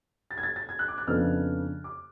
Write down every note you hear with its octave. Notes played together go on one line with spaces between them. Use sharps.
A6
G#6
A6
A6
G#6
F#6
D6
F#6
F2 C#3 F3 B3 D4 F6
D6